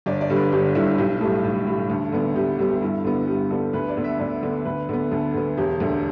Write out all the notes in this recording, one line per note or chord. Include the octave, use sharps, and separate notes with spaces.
G1 D5
D5
G2 D3 G3
B4
G1 G4
G2 D3 G3 E4
B1 G4
A2 G3 A4
B1
A2 G3
D2
D3 G3 B3
D2 G4
D3 G3 B3
G4
G2 E4
D3 B3
G2 G4
D3 B3 A4
D2 B4
D5
D3 B3
E5
D2 D5
D3 B3
D2 B4
D3 B3
D2 A4
D3 B3
E1 G4
D2 D3